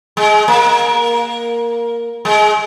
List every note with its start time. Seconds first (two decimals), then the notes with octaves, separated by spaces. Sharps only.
0.17 G#3
0.48 A#3
2.25 G#3